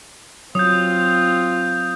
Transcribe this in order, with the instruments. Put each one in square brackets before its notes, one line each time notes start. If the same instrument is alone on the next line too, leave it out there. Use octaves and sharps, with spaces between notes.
[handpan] F#3 [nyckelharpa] C4 F4 [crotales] D#6 G6